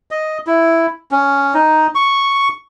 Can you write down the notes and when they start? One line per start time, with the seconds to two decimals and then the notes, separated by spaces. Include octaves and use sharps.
0.11 D#5
0.47 E4
1.11 C#4
1.54 D#4
1.95 C#6